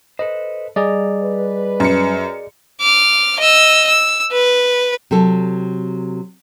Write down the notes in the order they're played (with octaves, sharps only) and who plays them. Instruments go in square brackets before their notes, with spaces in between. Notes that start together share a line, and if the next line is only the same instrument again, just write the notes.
[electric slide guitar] A4 B4 C5 [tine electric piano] D#5
[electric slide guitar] G3 A#5 [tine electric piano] G#4 D5 D#5
[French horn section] B4
[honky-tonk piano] F#2 C#7
[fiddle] D6 F6
D#5 E6
E6
B4
[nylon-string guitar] C3 F#3 A4